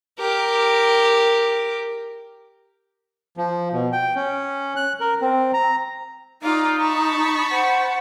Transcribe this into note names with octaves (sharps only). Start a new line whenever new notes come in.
G4 A#4
F3
B2
G5
C#4
F#6
A#4
C4
A#5
D#4 F4 D5 A#5 D6
A5 B5 C#6
C5 F#5